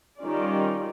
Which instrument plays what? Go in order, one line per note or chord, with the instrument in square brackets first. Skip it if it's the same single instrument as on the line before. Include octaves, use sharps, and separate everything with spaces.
[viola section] D#3 G3 C#4 F4 D5